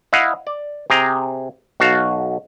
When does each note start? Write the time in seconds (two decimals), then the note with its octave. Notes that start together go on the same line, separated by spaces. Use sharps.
0.13 E4 D#5 F5 F#5
0.47 D5
0.90 C3 G#4 G5 A#5
1.80 B1 F#4 F5 A5